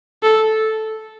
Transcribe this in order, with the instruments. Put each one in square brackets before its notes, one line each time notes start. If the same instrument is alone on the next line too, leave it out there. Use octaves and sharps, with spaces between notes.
[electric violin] A4